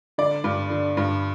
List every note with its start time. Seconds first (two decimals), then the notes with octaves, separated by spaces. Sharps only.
0.18 D3 D5
0.44 G2
0.70 D3
0.97 G2